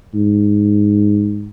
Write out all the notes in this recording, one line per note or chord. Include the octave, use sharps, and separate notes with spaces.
G#2